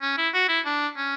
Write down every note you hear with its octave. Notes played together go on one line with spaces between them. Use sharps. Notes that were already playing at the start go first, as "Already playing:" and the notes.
C#4
E4
F#4
E4
D4
C#4